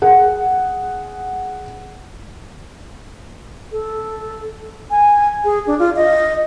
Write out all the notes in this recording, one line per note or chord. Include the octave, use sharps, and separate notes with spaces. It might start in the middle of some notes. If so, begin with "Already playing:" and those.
G#4 F#5
A4
G#5
G#4
D4
F4
D#5